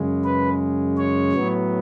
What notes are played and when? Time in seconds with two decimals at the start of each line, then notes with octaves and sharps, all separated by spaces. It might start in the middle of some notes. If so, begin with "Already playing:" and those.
Already playing: F#2 C#3 G#3
0.24 B4
0.97 C#5
1.32 A2 F#3 B3